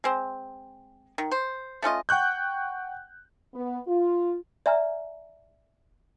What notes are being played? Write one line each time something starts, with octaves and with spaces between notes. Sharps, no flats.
G#3 C4
D#3
C5
A3 C#4 F4 D#5
F#5 G5 C#6 F#6 G6
B3
F4
D5 E5 G#5 A#5 F6